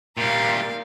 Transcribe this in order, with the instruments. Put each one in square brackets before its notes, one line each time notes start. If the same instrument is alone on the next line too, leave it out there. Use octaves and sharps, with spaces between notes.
[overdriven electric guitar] A#2 G3 [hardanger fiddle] A#4 F5